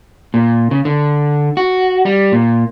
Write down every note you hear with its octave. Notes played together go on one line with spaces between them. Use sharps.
A#2
C#3
D3
F#4
G3
A#2